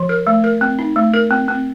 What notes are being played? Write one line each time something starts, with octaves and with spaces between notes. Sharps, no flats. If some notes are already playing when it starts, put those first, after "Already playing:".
Already playing: F3
A#4
A3
A#4
C4
D#4
A3
A#4
C4
C4